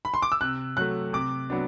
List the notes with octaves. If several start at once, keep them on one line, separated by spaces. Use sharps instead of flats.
B5
C6
D6
E6
C3 F#6
F#3 A3 F#6
C3 D6
F#3 B3 D4